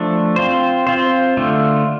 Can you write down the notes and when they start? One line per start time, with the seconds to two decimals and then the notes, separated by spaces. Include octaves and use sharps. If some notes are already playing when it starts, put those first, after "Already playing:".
Already playing: F3 A3 D4
0.36 C4 F4 C5
0.87 C4 F4 C5
1.37 D3 A3 F4